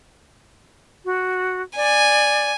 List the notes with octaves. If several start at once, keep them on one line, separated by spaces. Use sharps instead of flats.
F#4
D5 G#5